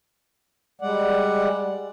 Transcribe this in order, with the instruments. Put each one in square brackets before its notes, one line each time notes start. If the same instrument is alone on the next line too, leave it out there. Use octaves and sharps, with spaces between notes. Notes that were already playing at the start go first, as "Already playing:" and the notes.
[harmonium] G3 G#3 D5 F#5